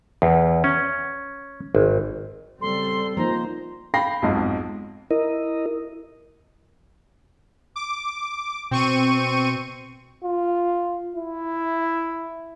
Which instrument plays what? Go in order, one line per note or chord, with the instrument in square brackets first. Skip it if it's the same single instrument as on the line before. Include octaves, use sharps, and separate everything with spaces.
[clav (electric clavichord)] E2
C#4
G#1
[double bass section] C#3 G3 C4 [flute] A4 [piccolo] C6
[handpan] F3 A#3 D#4 [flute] C5 [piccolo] A#5
[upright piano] F5 G5 B5 A#6 C7
B1 F2 G#2
[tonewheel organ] E4 A#4 D#5
[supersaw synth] D6
[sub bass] B2 [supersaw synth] C4 C#6 D#7
[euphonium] F4
E4